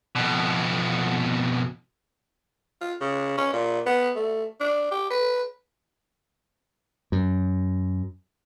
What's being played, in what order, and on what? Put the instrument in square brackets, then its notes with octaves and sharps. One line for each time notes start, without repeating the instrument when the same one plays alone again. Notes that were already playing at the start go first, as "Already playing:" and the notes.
[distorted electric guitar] F2 B2
[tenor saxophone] F4
C#3
C#4
A#2
B3
A3
D4
G4
B4
[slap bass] F#2